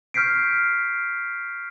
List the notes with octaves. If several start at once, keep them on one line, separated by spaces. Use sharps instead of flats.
C#6 F6 G6 B6 C7 D7